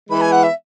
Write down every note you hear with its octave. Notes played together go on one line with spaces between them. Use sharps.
E3 G#3 B3 E4 B4 B5
G#5
F#5
E5